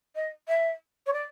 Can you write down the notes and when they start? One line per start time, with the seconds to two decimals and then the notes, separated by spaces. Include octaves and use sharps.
0.15 D#5
0.48 E5
1.06 C#5
1.13 D5